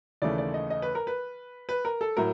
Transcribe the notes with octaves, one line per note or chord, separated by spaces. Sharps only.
D#2 C#3 E3 A3 D5
D5
D#5
D#5
B4
A#4
B4
B4
A#4
A4
A2 F#3 A#4